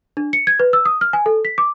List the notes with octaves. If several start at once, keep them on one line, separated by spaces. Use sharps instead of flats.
D4
C#7
G#6
B4
E6
D#6
F6
G#5
A4
B6
D6